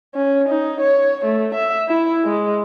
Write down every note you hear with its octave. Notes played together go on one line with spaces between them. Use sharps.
C#4
D#4
C#5
A3
E5
E4
G#3